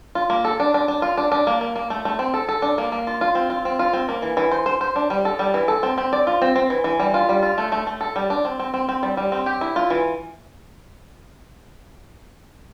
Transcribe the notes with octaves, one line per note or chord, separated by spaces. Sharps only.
F4
A#3
A4
D4
D4
D4
F4
D4
D4
A#3
A#3
A#3
A3
A3
C4
A4
A4
D4
A#3
A#3
F4
F4
C4
F4
C4
F4
C4
A#3
E3
E3
C5
C5
C5
D4
G3
A4
G3
E3
A4
C4
C4
D5
F4
C4
C4
E3
E3
G3
F4
G3
F4
A3
A3
A3
A4
G3
D4
C4
C4
C4
C4
G3
G3
C4
G4
E4
F4
E3